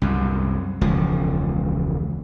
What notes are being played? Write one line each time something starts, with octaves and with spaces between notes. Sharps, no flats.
C2 F#2
E1 C#2 F3